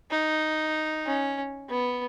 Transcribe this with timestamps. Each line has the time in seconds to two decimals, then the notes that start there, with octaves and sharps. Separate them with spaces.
0.11 D#4
1.06 C#4
1.70 B3